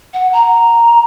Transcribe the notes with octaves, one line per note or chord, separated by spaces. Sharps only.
F#5
A#5